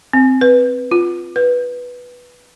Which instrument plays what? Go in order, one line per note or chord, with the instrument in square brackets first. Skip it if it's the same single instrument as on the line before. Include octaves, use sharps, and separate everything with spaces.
[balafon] C4
B4
F4
B4